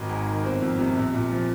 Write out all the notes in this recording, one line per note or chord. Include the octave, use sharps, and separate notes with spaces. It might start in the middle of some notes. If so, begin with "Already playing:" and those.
Already playing: G#1
G#2
D#3
G1 C4
F2
C3
A#1
A#2
F3